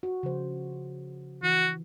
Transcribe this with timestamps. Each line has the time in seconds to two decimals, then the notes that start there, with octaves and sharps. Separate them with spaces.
0.03 F#4
0.23 C#3 F3 C5
1.43 E3 F#4